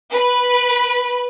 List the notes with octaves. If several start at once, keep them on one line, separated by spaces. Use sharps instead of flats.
B4